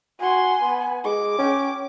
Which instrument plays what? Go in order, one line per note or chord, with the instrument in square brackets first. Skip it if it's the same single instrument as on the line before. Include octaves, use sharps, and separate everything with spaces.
[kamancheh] F#4 C6 [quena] G#5
[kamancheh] B3
[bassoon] G#3 [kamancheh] D6
[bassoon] C#4 [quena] G5